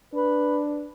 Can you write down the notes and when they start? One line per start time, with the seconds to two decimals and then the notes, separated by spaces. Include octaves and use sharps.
0.14 D4 B4